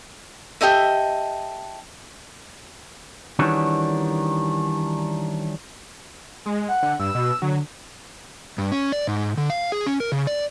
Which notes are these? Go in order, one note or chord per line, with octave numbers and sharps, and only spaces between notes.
G4 A4 D#5 E5
D#3 E3 G3 C#4 D4 F#4
G#3
F#5
D3
G2 E6
B2
D3 F#3
G2
C#4
D5
G#2
D3
F5
G#4
C#4
A#4
C#3
D5